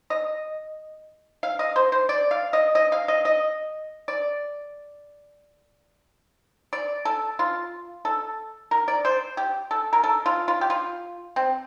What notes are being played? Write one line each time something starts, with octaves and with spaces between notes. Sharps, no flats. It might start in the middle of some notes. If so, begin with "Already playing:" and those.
D#5
F5
D#5
C5
C5
D5
F5
D#5
D#5
F5
D#5
D#5
D5
D5
A4
F4
A4
A#4
D5
C5
G4
A4
A#4
A4
F4
F4
G4
F4
C4